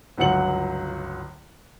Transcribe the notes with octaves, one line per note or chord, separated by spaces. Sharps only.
G1 C#2 F#3 F#5 C#7 F#7